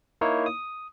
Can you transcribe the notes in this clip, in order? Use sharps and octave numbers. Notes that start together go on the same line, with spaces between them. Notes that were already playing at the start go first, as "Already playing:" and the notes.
A#3 D#4 E4 C#5
D#6